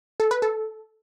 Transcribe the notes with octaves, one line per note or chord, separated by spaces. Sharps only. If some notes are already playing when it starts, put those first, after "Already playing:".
A4
B4
A4